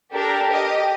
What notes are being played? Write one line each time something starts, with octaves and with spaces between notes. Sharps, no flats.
D4 G4 A4 A#4
G4 D#5